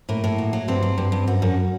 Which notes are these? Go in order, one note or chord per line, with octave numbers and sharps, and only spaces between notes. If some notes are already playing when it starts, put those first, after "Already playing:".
A2 A#3
A2
F#3
F#3
G2 C4
F#3
G2
G2
F#2 F#4
F#2